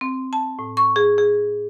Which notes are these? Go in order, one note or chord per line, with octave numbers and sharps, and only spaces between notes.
C4
A5
A2
C#6
G#4
G#4